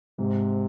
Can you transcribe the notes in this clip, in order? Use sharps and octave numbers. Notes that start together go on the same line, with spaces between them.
G#2 C3